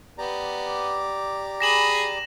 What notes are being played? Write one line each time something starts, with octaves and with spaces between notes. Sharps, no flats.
B3 G4 D5 A#5
G#4 B5 A#6 E7 F#7